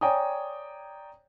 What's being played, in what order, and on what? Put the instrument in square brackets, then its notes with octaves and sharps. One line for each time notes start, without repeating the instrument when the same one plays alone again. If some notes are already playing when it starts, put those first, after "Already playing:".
[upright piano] C#5 D5 G5 G#5 A#5 D#6